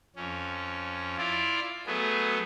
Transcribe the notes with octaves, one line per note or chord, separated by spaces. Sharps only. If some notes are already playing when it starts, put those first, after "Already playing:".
F2 C#4
E4 F4 D5
F#3 A3 B3 G#4